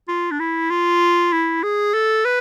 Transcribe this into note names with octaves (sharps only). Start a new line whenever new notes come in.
F4
D4
E4
F4
E4
G#4
A4
B4